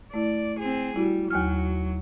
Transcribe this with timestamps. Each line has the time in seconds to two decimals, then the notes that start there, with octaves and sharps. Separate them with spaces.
0.14 A3 E4 D5
0.59 C4 G#4
0.96 G3 E4 F#4
1.30 D#2 F#3 G#5 F6